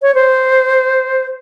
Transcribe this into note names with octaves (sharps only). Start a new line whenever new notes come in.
C#5
C5